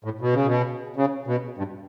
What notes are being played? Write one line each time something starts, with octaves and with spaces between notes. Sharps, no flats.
A2
B2
C#3
B2
C#3
B2
G2